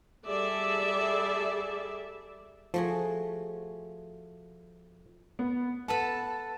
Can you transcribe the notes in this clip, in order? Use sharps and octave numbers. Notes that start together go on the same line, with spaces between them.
G3 G#4 A4 D5 E5
F3 A3 F#4 G#4
B3
A4 B4 F#5 A5